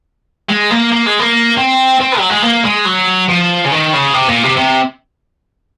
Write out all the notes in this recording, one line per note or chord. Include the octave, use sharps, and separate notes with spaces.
G#3
A#3
A#3
G#3
A#3
C4
C4
F#3
G#3
A#3
G#3
F#3
F3
C#3
D#3
C#3
C3
A#2
C3
C3